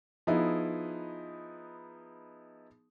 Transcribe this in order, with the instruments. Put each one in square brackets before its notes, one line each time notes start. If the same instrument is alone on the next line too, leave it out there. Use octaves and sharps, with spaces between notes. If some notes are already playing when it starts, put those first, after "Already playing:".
[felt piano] F3 B3 D#4 E4 G#4